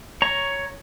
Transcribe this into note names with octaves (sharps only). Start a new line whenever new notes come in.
C#5 A#5 C#6